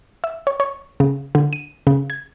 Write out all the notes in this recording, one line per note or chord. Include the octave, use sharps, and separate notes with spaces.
E5
C#5
C#5
C#3
D3
D#7
C#3
G#6